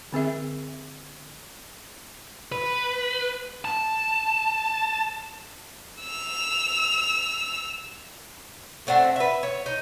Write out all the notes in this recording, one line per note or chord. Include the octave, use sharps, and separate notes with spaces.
D3 C4 G#4 E5
B4
A5
E6 F7
A3 C4 D4 F#5
B4 E5
C#5
D#4